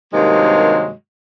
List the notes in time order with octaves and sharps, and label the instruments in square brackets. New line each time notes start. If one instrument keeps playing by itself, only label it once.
[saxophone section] G2 C3 D#3 F#3 G#3 A#3